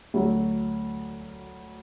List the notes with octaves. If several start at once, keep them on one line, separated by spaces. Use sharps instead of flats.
D2 F#3